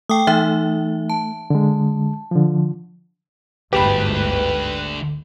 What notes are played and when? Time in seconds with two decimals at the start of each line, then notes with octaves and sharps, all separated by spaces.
0.10 A3 G5 D6 D#6
0.27 E3 D#4 E5
1.09 A5
1.50 D3 G#3
2.31 D3 F3
3.73 G1 D2 G#2 D3 A3 G4 B4 B5